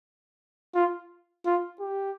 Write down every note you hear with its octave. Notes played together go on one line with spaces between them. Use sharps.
F4
F4
G4